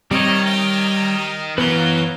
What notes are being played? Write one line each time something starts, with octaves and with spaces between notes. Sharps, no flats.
D#3 G3 C4 C#5 D#5 A#5
G5 A#5 D#6 F6
E3 F#3 B3 C#4 B4 F5 A#5 G6